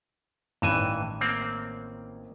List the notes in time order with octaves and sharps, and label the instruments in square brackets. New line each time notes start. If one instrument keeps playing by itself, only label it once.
[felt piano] A1 D#3 E7 [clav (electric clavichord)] G2 E3 G#5
[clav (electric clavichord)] A#3 C4